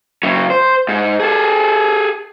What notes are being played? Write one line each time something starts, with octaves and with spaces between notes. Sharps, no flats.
C#3 F#3
C5
G#2
G#4 A4